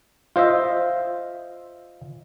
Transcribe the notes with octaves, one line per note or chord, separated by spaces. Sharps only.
F4 C5 D#5 E5